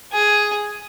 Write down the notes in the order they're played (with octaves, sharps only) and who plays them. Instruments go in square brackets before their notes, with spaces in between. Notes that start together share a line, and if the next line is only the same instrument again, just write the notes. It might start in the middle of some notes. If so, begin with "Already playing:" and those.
[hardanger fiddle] G#4